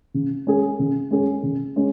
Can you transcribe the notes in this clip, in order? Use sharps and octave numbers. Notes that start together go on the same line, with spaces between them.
C#3
G#3 C#4 G#4
C#3
G#3 C#4 G#4
C#3
G#3 C#4